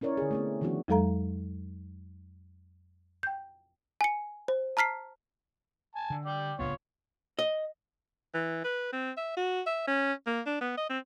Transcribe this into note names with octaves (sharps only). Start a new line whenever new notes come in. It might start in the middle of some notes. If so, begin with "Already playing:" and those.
C#4 E4 A#4 C#5 D5
D3 G#4
A3 B3 C4
D#3 F3 B3 D4 F#4
F2 F#3 G#3 A4 F5 A#5
G5 G6
G#5 C#7
C5
A5 A#5 F6 B6 C7
G#5 A5
D3
D5 G5
D1 C#2 B3 F4 C#5
D#5
E3
B4
C4
E5
F#4
E5
C#4
A#3
D4
B3
D#5
C4